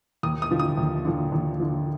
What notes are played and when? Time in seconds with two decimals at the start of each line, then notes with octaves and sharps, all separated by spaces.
0.23 D#2 D#6
0.42 D#6
0.51 D3 F3
0.60 D#6
0.77 D#2
1.05 D3 F3
1.32 D#2
1.60 D3 F3